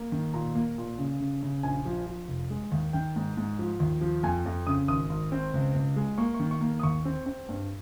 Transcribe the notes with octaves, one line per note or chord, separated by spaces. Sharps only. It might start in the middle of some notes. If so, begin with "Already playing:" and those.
Already playing: A#3
D#3
A#2 A#5
A#3
A#2
C#3
C#3
C#3
A#1 G#5
F3
F3
F1
G#3
D#2
D#3 G5
G#2
G#2
F3
D#2
F3
F2 G#5
F2
C#3 D#6
G#1 D#6
G#1
C4
C#2
C#2
G#3
A#3 C#6
C#6
D#3
C#6
A#3
D#6
D#2 C#6
C4
C4
G2